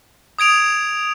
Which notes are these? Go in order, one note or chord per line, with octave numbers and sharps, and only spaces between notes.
D#6 G#6 D7 F7